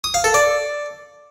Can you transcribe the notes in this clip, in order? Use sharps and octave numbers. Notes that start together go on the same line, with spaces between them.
D#6
F5
A4
D5